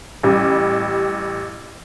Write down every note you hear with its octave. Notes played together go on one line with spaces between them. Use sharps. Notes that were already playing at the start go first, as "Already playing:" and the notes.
A1 G3